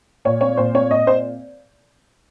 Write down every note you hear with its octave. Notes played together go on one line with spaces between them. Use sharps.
A#2 C#5
C4 C#5
A#2 C5
C4 C#5
A#2 D#5
C4 C5